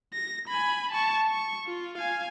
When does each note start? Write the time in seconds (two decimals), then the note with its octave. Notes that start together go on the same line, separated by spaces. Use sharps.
0.13 A#6
0.48 G#5 B5
0.91 A5 C#6
1.28 C#6
1.67 F4
1.98 F5 G#5